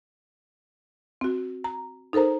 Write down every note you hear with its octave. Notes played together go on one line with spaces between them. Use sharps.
C4 F#4
A#5
D#4 A4 A#4 C5 A#5